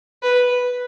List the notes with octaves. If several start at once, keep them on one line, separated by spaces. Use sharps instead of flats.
B4